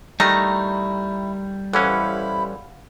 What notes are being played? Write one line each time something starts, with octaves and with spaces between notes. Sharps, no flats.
D#3 G3 A3 D#4 E4 A#5
A1 E3 C#4 E4 C5 F5 F#5 B5